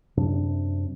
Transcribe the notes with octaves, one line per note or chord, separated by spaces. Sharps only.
F#2 C3 D4